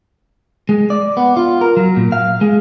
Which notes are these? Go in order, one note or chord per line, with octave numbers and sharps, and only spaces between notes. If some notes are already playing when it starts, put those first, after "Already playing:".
G#3
D5
B3
F4
A#4
F#3
A#2
F5
G#3